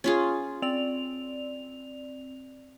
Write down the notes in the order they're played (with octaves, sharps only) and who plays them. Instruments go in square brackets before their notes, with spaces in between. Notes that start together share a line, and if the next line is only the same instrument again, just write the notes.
[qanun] C#4 F4 G#4
[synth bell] C4 D5 F7